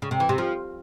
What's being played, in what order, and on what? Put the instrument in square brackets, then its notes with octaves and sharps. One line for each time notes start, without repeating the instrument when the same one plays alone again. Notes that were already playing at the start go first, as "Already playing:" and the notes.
[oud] C#3
C3
E3
C3
F3